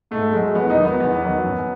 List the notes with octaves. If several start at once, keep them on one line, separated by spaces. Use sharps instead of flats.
G#2 A3
F#3 G#3
E2 B3
D#4
D#3 F#3
B3
E2 B3
D#3 F#3
F#2